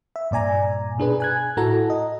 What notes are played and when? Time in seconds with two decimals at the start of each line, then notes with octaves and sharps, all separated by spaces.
0.16 E5
0.31 G2 A#2 D5 G#5 A#5
0.98 B2 D4 G#4 B4
1.20 G#5 F#6 G#6
1.57 A2 E4 F#4 A4 A#5
1.90 D#5